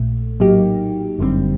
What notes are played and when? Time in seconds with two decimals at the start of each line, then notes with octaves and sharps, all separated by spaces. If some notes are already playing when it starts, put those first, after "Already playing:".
Already playing: A#1 A#2 A3
0.40 A2 F#3 A#3 D#4 G4
1.18 G1 F#2 D3 G3 C4